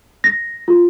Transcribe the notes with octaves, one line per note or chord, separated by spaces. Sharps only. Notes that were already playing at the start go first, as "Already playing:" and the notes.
A#6
F4